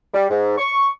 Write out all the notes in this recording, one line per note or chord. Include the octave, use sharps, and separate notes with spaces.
G3
G#2
C#6